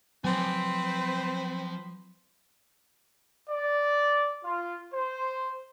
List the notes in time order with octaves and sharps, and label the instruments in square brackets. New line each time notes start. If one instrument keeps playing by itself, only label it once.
[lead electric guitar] F3 G#5 [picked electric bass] F#3 [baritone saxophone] C4 [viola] B4 C5
[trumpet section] D5
F4
C5